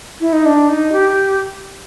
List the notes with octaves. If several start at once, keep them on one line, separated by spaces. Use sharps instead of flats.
E4
D#4
D4
D#4
G4